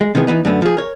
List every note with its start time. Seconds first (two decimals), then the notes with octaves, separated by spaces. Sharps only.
0.01 G#3
0.15 C3 D#3 E3 B3 G#4
0.27 E3 G3 B3 D#4
0.45 F#2 D3 A3 B3
0.62 F3 G#4
0.77 A#4 C#5